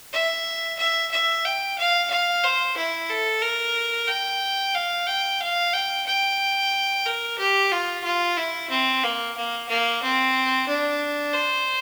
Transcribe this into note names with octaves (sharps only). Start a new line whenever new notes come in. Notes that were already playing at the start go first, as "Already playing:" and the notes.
E5
E5
E5
G5
F5
F5
C5
E4
A4
A#4
G5
F5
G5
F5
G5
G5
A#4
G4
F4
F4
E4
C4
A#3
A#3
A#3
C4
D4
C5